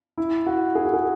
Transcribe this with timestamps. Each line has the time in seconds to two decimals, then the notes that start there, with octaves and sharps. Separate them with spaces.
0.18 E4
0.46 F#4
0.75 G#4
0.85 F#4
0.94 G#4